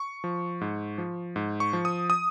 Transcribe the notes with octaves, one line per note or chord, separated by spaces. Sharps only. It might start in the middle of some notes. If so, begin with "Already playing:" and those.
Already playing: C#6
F3
G#2
F3
G#2
C#6
F3
D#6
D#6